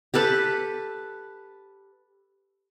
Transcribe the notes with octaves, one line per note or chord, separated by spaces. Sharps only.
G4 A4 B4 A5